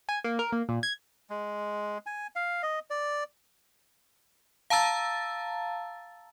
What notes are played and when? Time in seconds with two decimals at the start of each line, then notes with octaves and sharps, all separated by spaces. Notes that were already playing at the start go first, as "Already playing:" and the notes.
0.09 G#5
0.24 A#3
0.39 A#4
0.52 A#3
0.69 A#2
0.83 G#6
1.30 G#3
2.06 G#5
2.36 F5
2.63 D#5
2.90 D5
4.70 F5 A5 A#5 E6 A6